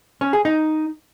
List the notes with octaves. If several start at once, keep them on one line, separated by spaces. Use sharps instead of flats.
C#4
G#4
D#4